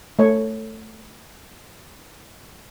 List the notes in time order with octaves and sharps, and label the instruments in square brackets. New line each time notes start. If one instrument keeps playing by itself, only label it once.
[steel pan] A3 C#5